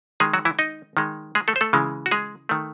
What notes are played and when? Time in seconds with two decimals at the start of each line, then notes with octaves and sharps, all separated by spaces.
0.20 D#3 G#3 G#4
0.33 F#3 F#4
0.45 E3 E4
0.59 D#4 D#5
0.97 D#3 G#3
1.35 G#3 G#4
1.48 A3 A4
1.56 C5
1.61 A3 A4
1.73 C#3 E3 G#3
2.06 F#4
2.11 G#3 G#4
2.49 D#3 A3